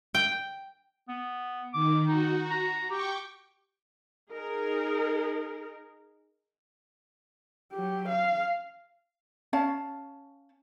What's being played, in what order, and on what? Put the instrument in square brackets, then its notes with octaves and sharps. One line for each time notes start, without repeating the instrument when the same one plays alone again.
[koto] G5
[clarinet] B3
[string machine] D#3 [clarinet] D6
[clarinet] D#4 [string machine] F#4
[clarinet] A#5
[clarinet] G4 [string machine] G5 C#6 D6
[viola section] D#4 G#4 A#4
[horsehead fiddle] F#3 G4
F5
[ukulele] C#4 C#5 F5 A5